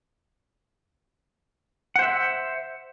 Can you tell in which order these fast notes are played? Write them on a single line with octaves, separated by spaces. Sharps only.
F#5 C5 E5